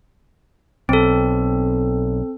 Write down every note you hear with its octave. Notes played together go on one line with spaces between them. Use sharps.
B1 C4 A4